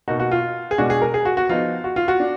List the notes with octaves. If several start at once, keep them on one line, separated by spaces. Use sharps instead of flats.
B2 A#3 D#4 F#4
F#4
F4
G#4
B2 G#3 D4 F#4
G#4
A#4
G#4
F#4
F#4
F3 B3 D#4 F4
F#4
F4
F#4
D4